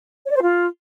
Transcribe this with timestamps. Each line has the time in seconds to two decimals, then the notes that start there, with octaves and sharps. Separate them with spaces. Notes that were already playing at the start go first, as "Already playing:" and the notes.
0.25 C#5
0.30 D5
0.36 C5
0.41 F4